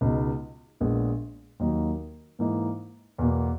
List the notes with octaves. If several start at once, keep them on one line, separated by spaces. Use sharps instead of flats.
C#2 B2 G#3 D#4
A#1 A#2 G#3 B3
D#2 D#3 F#3 A#3 D#4
G#2 E3 A#3 D#4
E2 B2 A#3